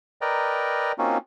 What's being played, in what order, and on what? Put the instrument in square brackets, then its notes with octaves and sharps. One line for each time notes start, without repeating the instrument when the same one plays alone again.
[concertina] A#4 B4 D5 D#5 G5 A#5
A#3 C4 C#4 D#4 F4 F#4